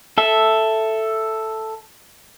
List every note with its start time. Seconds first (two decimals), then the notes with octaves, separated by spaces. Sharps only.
0.18 A4 E5